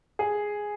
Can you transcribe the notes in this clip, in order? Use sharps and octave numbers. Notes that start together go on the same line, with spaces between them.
G#4